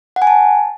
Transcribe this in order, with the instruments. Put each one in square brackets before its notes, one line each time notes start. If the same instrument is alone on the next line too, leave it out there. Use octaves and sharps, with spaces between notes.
[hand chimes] F#5
G#5
A5